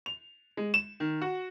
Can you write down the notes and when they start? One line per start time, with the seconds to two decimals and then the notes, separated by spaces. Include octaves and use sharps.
0.06 F7
0.57 G#3
0.74 E7
1.00 D#3
1.22 F#4